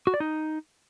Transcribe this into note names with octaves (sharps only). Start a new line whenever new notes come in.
F#4
D5
D#4